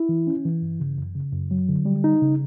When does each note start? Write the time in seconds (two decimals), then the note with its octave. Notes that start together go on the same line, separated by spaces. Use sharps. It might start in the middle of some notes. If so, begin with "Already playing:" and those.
Already playing: E4
0.09 E3
0.27 C#4
0.45 E3
0.62 G2
0.80 C#3
0.98 F#2
1.15 C#3
1.32 F#2
1.51 F#3
1.69 D3
1.85 G3
2.04 D#4
2.22 C#3